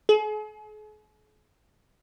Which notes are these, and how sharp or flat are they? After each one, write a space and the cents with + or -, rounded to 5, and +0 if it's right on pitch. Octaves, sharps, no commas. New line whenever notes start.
G#4 +40